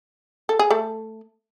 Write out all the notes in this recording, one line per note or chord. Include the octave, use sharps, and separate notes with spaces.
A4
G#4
A3 A4